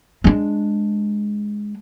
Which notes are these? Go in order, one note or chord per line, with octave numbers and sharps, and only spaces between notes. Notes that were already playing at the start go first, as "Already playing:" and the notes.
G#3 D4